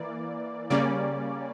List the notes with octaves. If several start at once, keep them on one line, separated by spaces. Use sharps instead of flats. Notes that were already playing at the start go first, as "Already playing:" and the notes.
Already playing: E3 A#3 D5
C#3 G3 A#3 C#4 D5